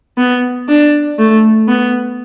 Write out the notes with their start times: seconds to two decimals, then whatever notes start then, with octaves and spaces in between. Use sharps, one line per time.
0.18 B3
0.68 D4
1.18 A3
1.68 B3